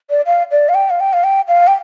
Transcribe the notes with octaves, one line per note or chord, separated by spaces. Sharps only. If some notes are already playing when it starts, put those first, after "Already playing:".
D5
F5
D5
F5
G5
F5
G5
F5
G5
F5
G5